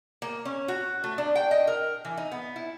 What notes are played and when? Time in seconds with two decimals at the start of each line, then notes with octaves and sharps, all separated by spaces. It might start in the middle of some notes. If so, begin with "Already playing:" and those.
0.22 A#3
0.45 C#4
0.68 F#4
1.04 A3
1.18 D4
1.35 G5
1.51 D#5
1.67 A#4
2.05 E3
2.17 D#4
2.32 B3
2.56 E4